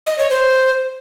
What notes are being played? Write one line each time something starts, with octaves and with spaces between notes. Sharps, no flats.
D#5
C#5
C5